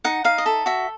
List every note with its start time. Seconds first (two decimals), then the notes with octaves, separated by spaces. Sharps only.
0.04 D#4 F#5
0.24 D#4 F5
0.38 D#5
0.46 A4 E5
0.66 F#4 E5